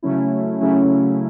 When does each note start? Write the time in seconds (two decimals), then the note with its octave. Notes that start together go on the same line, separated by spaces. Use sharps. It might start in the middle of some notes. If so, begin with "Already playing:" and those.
0.03 C#3 F#3 A3 C#4 E4
0.60 C#3 F#3 A3 C#4 E4